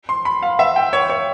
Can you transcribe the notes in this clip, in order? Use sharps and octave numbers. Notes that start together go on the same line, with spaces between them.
C6
B5
F5
E5
G5
C#5
C#5